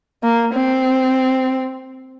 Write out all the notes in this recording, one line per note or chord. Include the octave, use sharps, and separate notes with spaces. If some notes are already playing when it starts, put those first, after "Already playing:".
A#3
C4